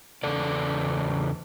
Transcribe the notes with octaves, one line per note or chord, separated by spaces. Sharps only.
E2 C#3 A4 D5